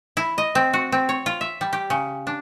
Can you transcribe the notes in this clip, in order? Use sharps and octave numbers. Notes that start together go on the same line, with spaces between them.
E4
D#5
C4
F#4
C4
C#5
F4
E5
G3
G4
C#3
D4